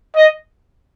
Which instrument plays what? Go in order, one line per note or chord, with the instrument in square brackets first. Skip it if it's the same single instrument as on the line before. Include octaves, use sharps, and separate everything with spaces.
[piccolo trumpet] D#5